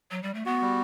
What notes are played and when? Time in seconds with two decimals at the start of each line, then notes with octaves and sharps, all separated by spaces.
0.11 F#3
0.23 G3
0.34 A3
0.46 B3 F#4
0.62 G3